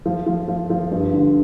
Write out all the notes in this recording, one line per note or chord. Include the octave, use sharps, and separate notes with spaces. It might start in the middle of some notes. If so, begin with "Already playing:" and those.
F3
F3
F3
F3
G2
D3